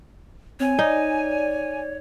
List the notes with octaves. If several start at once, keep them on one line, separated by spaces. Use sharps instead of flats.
C4 C#5 G#5
D#4 D5